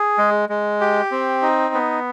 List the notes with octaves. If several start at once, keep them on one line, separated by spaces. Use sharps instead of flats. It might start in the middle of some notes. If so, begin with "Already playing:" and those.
Already playing: G#4
G#3
G#3
G4
C4
D#4
B3